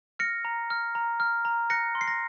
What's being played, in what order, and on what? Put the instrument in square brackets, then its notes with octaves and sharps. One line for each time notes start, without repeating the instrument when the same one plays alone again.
[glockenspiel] F6 A#6 C#7
A#5
F6
A#5
F6
A#5
F#6 A#6 C#7
C6
C7
A#6